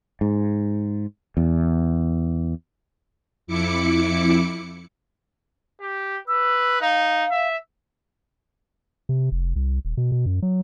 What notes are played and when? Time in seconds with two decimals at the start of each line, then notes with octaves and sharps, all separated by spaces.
0.21 G#2
1.37 E2
3.47 F2 E4 D6 C#7
5.81 G4
6.27 B4 E6
6.81 D#4 F5
7.31 E5
9.09 C3
9.32 F1
9.56 C2
9.85 D#1
9.97 B2
10.12 B2
10.26 F#2
10.42 F#3